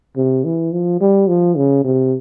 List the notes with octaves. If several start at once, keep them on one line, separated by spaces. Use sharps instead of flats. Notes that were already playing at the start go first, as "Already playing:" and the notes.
C3
E3
F3
G3
F3
C#3
C3